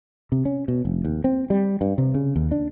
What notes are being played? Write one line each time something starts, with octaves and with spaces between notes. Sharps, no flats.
C3
C#4
B2
F1
D#2
C4
G3
G2
C3
C#3
D#2
D4